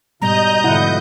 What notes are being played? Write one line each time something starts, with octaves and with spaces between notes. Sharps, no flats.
G#2 B2 G3 D#5 A#5 G6
G#2 B2 D3 F3 E4 F#5